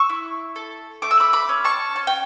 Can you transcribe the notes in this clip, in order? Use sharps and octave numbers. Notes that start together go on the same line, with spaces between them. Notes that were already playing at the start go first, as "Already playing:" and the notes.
Already playing: C#6 E6
E4
A4
A3 D6
E6
B5 D6
B5 D6
C#4
A5 C#6
C#4 A5
G5